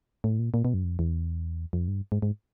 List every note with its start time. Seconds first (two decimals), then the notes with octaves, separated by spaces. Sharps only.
0.24 A2
0.39 A#2
0.54 A#2
0.65 B2
0.74 F#2
0.84 F2
0.99 E2
1.73 F2
1.88 G2
2.12 G#2
2.22 G#2